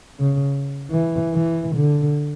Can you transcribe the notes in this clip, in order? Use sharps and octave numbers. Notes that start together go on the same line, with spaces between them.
C#3
E3
E3
D3